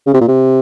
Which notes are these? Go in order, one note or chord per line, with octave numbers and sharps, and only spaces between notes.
C#3
C3
A#2
C3